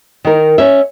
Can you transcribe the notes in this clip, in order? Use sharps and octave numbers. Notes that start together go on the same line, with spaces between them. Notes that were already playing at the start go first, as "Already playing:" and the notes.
D#3 A#4
C#4 E5